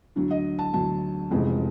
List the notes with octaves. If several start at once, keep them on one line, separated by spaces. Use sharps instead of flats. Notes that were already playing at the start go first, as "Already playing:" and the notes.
D2 D3 F#3
D#5
A5
D2 D3 F#3 A5
F1 F2 C#3 E3 G#3